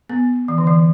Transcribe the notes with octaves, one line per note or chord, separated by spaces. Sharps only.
B3
E3
D3
E3